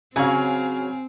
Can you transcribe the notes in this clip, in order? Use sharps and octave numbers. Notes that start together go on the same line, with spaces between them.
C#3 F#3 C4 F5 G#5